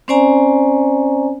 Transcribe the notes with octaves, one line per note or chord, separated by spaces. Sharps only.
C4 C#4 C5 D5 G#5 A#5